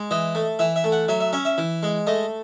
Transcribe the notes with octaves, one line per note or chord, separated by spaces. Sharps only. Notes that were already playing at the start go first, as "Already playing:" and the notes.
Already playing: G#3
E3 D#5
A3
E3 E5
E5
A3
F#5
F#3 E5
E5
C#4 E5
E5
E3
G#3
A3 D#5